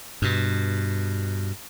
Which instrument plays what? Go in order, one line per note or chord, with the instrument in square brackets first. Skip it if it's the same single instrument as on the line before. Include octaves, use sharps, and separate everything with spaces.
[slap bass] G2 B2